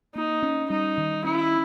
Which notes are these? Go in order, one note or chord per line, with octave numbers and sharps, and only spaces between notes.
A#3 D#4
C#4
G3 D#4
D#3
C#4 E4